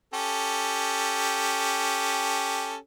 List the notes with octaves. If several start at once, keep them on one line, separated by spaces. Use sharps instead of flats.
C#4 G4 A4